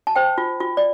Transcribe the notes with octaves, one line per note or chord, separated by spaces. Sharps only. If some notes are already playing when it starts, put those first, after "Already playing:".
A5
C5 G5
F4
F4
D5